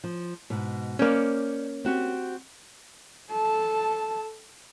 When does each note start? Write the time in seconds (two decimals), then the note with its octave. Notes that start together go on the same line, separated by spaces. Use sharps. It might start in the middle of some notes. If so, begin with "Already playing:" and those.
0.04 F3
0.50 G#2 B2
0.99 A#3 C#4 C5 D5
1.85 C4 F#4 G4
3.31 A4 A5